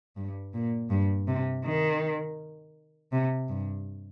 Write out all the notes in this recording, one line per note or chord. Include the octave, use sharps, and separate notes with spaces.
G2
A#2
G2
C3
D#3
C3
G2